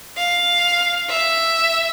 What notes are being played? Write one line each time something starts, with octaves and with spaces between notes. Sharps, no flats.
F5
E5